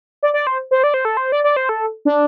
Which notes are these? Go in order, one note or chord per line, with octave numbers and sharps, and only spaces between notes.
D5
D5
C5
C5
D5
C5
A4
C5
D5
D5
C5
A4
D4